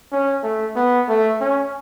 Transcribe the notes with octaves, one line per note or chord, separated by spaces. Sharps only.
C#4
A3
B3
A3
C#4